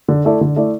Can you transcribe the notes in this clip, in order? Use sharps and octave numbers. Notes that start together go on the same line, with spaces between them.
D3
A3 E4 A4 D5
D3
A3 E4 A4 D5